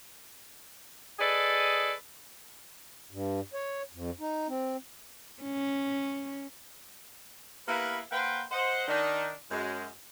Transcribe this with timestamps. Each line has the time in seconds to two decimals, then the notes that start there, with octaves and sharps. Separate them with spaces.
1.19 G#4 A4 B4 D5 D#5
3.11 G2
3.54 C#5
3.93 F2
4.20 D#4
4.48 C4
5.43 C#4
7.68 A#3 B3 E4 G4 A#4 B4
8.12 A#3 B4 C5 F#5 G5
8.51 C5 D#5 F#5
8.88 D#3 D4 D#4
9.51 F#2 G#3